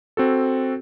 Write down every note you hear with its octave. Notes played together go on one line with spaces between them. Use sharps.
C4 F#4 A4